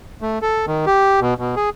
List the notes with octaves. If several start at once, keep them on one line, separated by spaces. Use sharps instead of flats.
A3
A4
D#3
G4
B2
B2
G#4